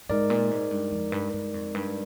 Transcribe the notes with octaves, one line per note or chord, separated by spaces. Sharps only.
G#2 G#3 D#4 A#4 D5
A#2
G#2
G2
F2
G2
G2
F2
G2